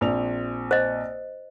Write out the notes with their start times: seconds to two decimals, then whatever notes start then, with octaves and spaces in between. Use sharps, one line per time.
0.01 A#1 C4 F7
0.71 C5 D#5